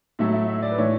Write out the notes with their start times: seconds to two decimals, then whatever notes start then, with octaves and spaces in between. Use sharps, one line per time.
0.19 A2 F#3 A3 E5
0.34 E5
0.48 E5
0.62 D5
0.71 B4
0.78 A2 E3 A3 C#5